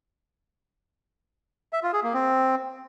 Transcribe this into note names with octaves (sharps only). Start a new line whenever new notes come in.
E5
F4
G#4
A#3
C4